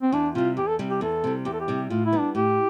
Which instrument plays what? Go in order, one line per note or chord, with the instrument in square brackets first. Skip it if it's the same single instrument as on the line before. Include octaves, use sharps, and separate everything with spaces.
[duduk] C4
[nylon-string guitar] E2 [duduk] D4
[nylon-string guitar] C3 G3 [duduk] F4
[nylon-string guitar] E2 [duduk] G4
[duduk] A4
[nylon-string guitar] C3 G3
[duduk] G4
[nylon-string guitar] E2 [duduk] A4
[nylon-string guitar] C3 G3
[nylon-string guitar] E2 [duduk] G4
[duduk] A4
G4
[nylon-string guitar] C3 G3
[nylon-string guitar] A2 [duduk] F4
[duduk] E4
[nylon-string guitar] G3 B3
[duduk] D4
[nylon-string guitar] A2 [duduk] G4